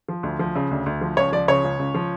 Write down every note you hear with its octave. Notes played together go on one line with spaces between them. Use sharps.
F3
D2
F3
C#3
D2
D2
F3
C#2 C#5
F3 D5
C#3 C#5
C#2
C#2
F3